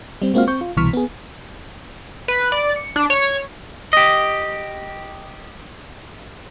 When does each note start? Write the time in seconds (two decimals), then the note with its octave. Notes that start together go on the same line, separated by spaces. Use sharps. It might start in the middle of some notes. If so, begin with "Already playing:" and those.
0.22 G3 C4
0.34 G#3 A#3 C4 F4 F#4 F5
0.47 C4 C#6 G6
0.61 F4
0.77 C2 B2 E3 C#6 F6 B6
0.93 B3 G#4
2.28 B4
2.52 D5
2.76 C#7
2.96 D4
3.10 C#5
3.93 G4 D#5